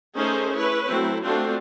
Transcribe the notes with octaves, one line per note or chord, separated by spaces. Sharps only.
A3 C#4 D#4 G#4 A#4 C5
E4 B4 C#5
F#3 A3 C4 E4
A3 C4 D4 F4 F#4